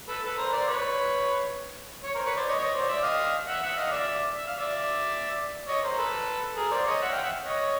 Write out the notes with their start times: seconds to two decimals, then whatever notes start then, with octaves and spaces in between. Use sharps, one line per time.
0.08 A4 B4
0.24 A4 B4
0.38 A#4 C5
0.53 C5 D5
0.68 B4 C#5
2.04 C#5
2.15 A#4 C5
2.26 B4 C#5
2.37 C5 D5
2.48 C#5 D#5
2.59 C#5 D#5
2.74 C5 D5
2.88 D5 E5
3.03 D#5 F5
3.48 E5 F#5
3.63 E5 F#5
3.77 D#5 F5
3.91 D5 E5
4.37 E5
4.47 F5
4.58 D5 E5
5.68 C#5 D#5
5.84 A#4 C5
5.98 A4 B4
6.57 G#4 A#4
6.71 C5 D5
6.86 C#5 D#5
7.02 E5 F#5
7.12 F5 G5
7.23 E5 F#5
7.45 C#5 D#5